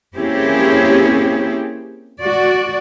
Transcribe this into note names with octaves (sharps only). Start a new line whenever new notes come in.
A#3 C4 C#4 E4 G4 G#4
F#4 D5